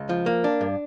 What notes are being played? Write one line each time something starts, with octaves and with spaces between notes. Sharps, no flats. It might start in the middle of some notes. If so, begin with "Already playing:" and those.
Already playing: C#2
F3
A#3
D4
G2